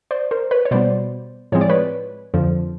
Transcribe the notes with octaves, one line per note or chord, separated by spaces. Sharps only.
C5 D5
A#4 C5
B4 C#5
C#5
B2 G3 B3 C5 D5
A2 F3 G#3 C4 C#5
D5
B4 C#5
F2 D3 F3